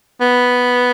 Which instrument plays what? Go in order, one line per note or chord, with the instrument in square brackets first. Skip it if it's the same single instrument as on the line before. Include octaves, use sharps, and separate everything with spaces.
[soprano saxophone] B3